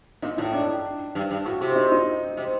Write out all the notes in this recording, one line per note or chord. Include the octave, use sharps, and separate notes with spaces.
A#2 D#4
A2 D#4
D4
G2
G2
A2 F#4
C3 F#4
D#4
D#4
C3